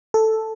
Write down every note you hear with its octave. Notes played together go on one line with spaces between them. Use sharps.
A4